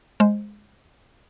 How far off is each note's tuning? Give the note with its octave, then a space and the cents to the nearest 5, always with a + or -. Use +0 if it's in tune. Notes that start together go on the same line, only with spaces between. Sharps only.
G#3 +0 C5 +0